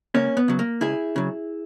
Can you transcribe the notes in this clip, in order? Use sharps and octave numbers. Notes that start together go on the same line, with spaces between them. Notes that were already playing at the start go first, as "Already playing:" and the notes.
C#2 A#3 C#4
B3
C#3 F#3
A#3
C#2 E4 G#4
C#3 F#3